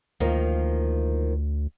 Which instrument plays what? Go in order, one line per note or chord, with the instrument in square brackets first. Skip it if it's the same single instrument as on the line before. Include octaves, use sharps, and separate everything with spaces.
[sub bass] D2 [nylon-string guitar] D#3 F3 A#3